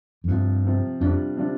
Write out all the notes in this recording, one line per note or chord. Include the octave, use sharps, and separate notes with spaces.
F2
G2 C3 F3 C4 F4
C3 F3 C4 F4
F2 C3 G3 D4 F4
C3 G3 D4 F4